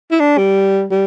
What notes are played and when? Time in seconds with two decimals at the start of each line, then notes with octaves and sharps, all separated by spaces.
0.11 E4
0.20 D4
0.38 G3
0.91 G3